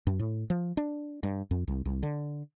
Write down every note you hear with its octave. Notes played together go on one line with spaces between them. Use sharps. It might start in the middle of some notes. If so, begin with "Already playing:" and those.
F#2
A2
F3
D4
G2
F2
C2
C2
D3